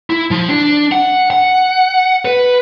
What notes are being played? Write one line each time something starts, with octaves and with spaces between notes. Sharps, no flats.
E4
F3
D4
F#5
F#5
B4